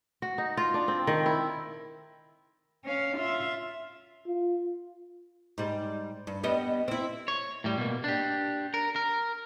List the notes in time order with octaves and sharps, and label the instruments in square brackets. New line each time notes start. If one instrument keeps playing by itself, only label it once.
[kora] F#4
D#4
F4
D4
C4
D#3
E4
[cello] C#4 F5
F4 E5
[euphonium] F4
[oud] G#2 G3
G2
G3 B3 D#5
C4 E4
[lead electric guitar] C#5
A2 G3
B2 A#3
D4 G4
A#4
A#4